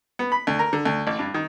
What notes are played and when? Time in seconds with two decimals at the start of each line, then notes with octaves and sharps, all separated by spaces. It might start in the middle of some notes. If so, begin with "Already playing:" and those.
0.19 B3
0.32 B5
0.47 D2
0.59 A#4
0.73 D3
0.85 D2
1.07 A1
1.19 G2
1.34 D#3